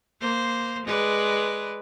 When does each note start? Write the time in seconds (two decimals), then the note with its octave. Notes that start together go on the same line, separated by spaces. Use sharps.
0.20 A#3 C5
0.85 G#3 B4 D5